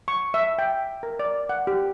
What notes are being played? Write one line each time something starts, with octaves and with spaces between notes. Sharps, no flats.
C#6
E5
G5
A#4
D5
F#5
G4